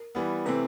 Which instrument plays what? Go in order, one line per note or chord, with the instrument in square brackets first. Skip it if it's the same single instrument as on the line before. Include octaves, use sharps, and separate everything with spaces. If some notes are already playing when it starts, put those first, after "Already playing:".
Already playing: [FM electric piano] A#4
[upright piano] E3 G3 B3
[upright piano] C3 E3 A3 C4 [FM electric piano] B4